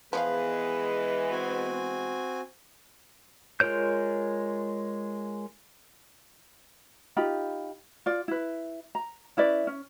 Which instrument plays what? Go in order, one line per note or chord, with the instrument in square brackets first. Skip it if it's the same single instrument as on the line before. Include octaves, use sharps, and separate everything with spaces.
[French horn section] E3 G#3 B3 [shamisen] F3 C#5 F5 [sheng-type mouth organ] G#4 [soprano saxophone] B4
[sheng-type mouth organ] C4 F#4 G#5
[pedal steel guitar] G#3 F4 A#4 C#5 G6
[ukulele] D#4 F4 G4 B5
F4 D5
E4 B4
A#5
C#4 E4 B4 D5
C#4